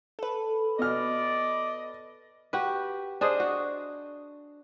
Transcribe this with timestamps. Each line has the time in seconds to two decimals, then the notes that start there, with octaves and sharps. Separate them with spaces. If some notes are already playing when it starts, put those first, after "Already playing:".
0.19 A4 B4
0.79 B2 D5 D#5 F6
2.53 F#4 G4 B4
3.21 D4 G#4 C5 D#5
3.40 F#4